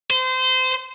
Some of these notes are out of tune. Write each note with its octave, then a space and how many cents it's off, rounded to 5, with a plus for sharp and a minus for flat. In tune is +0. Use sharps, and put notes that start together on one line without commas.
C5 -25